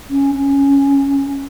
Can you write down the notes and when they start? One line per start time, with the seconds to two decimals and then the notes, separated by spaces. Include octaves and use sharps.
0.10 C#4
0.35 C#4